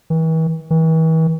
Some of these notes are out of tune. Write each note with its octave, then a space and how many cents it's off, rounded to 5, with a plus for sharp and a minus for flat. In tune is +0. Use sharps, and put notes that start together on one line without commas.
E3 -40
E3 -40